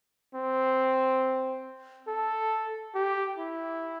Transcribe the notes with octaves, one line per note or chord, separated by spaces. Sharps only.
C4
A4
G4
E4